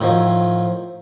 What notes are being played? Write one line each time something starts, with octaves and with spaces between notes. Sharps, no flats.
A2 D#3 F3 F#3